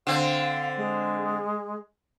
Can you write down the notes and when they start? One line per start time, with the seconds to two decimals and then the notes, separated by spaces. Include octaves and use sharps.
0.07 D3 C4 F5
0.77 G#3